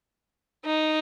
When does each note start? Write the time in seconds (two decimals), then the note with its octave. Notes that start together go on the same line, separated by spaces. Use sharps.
0.65 D#4